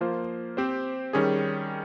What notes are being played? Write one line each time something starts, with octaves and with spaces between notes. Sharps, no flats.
F3 A#3 F4 C5
C4 G4 C5
D#3 G3 C#4 G#4